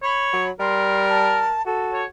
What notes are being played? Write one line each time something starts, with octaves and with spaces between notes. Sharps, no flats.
C#5 B5
F#3
G3 A#4 C6
A5
F#4 A4
C#5